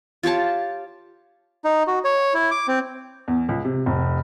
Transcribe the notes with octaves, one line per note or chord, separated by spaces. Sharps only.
F4 G4 C#5 A5
D#4
F#4
C#5
E4
D6
C4
E2
C#2
C3
F1